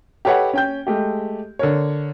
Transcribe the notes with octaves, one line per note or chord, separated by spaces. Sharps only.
G4 A4 B4 C#5 D#5 F#5
C#4 G5 G6
G#3 A3 G4
D3 A#4 C#5